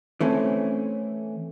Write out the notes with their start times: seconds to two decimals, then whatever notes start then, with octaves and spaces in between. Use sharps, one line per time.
0.21 E3 A3 C4 C#4